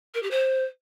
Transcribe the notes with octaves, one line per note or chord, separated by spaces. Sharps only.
A#4
G4
C5